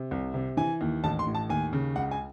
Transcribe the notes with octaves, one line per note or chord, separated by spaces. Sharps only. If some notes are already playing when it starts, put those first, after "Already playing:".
Already playing: C3
C2
C3
E3 G#5
D#2
A1 A5
C6
A2
A5
D#2 G#5
C#3
C#2 F#5
G#5